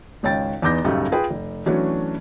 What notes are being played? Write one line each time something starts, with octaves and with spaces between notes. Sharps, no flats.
G#1 C#2 C#5 G5 A6
E2 B3 D#4 D6 G6 A#6
B1 F#2 A2 C#3 G3 A3
F4 G#4 B4 G5
F1
E3 F#3 A3 C#4 D4 F#4